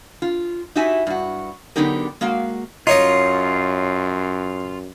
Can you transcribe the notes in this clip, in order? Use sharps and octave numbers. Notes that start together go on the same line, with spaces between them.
F4
D#4 E4 F#4 G4 E5 G#5
G2 F#4
D3 F#3 B3 D#4 G4 A#4
G#3 A#3 F#4 F5
F#2 D#4 F4 C#5 D#5